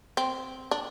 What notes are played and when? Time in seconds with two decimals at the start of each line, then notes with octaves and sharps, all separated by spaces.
0.17 C4
0.71 D4